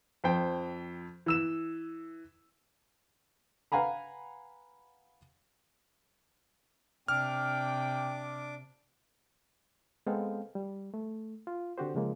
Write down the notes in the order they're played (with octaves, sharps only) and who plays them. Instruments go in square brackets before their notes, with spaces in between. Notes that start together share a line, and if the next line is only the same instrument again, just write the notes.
[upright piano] F2 C5 G5
E3 E6 E7
[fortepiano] B4 F5 F#5 G#5 A#5 B5
[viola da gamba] C3 [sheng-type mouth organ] D4 D6 [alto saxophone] G5 [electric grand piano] F6
[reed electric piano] G#3 B3 C4 A4 F5 G5
G3
A3
F4
D3 C4 F#4 G4 C5
C#3 F3 G#3 A#3